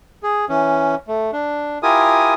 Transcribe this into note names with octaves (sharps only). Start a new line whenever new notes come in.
G#4
E3 C#4
A3
D4
E4 F4 G4 A#4 G#5 D#6